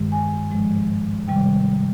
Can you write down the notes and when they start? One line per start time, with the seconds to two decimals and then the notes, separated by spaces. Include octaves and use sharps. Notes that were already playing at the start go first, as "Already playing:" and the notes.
Already playing: G2 D#3 G#3
0.12 G#5
0.50 G#2 F3 G#3
1.28 C3 D#3 G3 G5